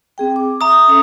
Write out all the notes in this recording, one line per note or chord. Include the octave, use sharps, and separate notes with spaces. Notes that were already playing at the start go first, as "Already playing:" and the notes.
C4 G#4 G5
D6
E5 A#5 D#6
C#4 A4 E5